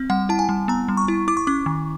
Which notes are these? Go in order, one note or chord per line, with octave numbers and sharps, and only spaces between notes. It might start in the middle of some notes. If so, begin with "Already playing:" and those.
Already playing: C4
G3 F#5
E4 A5
G#5
G3
B3 A#5
G3
C#6
E4
E4 D6
C#6
C#4 D6
D#3